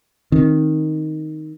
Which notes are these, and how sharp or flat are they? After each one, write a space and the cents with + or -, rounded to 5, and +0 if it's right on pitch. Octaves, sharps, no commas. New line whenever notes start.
D#3 +0 C4 +15